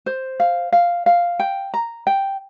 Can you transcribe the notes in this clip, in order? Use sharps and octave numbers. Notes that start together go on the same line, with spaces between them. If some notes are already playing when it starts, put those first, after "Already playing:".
C5
F5
F5
F5
G5
A#5
G5